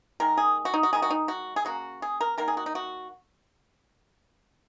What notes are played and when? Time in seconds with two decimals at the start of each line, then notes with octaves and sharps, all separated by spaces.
0.20 D#3 G#3 A#4
0.37 G#4
0.65 F#4
0.74 D#4
0.83 F#4
0.93 D#3 G#3 G#4
1.02 F#4
1.10 D#4
1.28 F#4
1.56 G#4
1.65 C#3 A#3 F#4
2.02 G#4
2.21 A#4
2.38 D#3 A#3 A#4
2.48 G#4
2.57 F#4
2.66 D#4
2.75 F#4